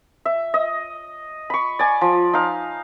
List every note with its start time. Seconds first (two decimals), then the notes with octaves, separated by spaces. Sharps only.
0.25 E5
0.54 D#5
1.50 B5 C#6
1.79 D5 G#5
2.01 F3
2.33 D#4 F5